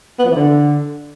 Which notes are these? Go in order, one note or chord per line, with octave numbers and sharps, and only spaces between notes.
B3
F3
E3
D3